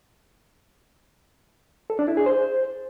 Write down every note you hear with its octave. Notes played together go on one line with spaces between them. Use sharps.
A4
D4
E4
G#4
C5